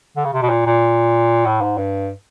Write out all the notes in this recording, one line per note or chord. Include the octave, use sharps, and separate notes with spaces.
D3
C#3
C3
B2
A#2
A#2
A2
G#2
G2